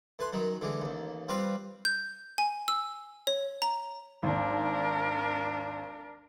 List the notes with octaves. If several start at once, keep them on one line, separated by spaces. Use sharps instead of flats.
A2 B4 C6
F#2 D#3 F#3
D3 E3 G#3
A1 D#2
G3 C4 F4 B4 F5 B5
G6
G#5
E6
C#5
A#5
G#1 D#2 D4 A#4